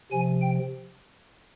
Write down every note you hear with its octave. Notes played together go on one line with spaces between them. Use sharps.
C3 F3 G#5
G5